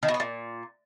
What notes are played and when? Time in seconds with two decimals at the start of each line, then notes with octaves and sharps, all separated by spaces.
0.03 D#3
0.08 B2
0.14 B3
0.20 A#2